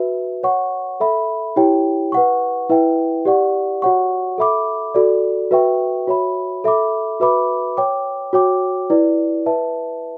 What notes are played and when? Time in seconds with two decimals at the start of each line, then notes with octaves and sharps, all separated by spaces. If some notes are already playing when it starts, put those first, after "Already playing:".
Already playing: F#4 B4 E5
0.43 C#5 F#5 C#6
1.00 A4 E5 B5
1.56 E4 G4 C#5 G5
2.12 B4 F#5 C#6
2.69 E4 B4 E5 G5
3.25 G4 D5 F#5 C#6
3.82 F#4 C#5 F#5 C#6
4.38 A4 E5 B5 D6
4.94 F#4 A4 D5
5.51 F#4 B4 E5 G5 C#6
6.08 F#4 C#5 E5 B5
6.64 A4 E5 B5 D6
7.20 F#4 B4 E5 B5 D6
7.77 C#5 G5 D6
8.33 F#4 C#5 G5 D6
8.90 E4 B4 D5
9.46 B4 E5 A5